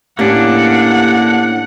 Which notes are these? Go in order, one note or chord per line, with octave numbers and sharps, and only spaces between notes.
A2 A#3 C#4 D4 G4 F#5